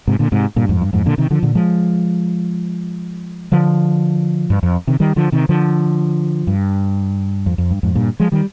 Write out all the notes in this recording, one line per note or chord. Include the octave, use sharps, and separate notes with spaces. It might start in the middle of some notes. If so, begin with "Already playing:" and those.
G#2 C3
A#2 D3
G#2 C3
G2 A#2
F2 G#2
G2
F2 G#2
A#2 D3
C3 D#3
D3 F3
A#2 D3
F3 G#3
D3 F3
G2
F2
C3 D#3
D#3 G3
D3 F3
C3 D#3
D3 F3
G2
F2
F2
G2
F2 G#2
G2 A#2
F3 G#3
D#3 G3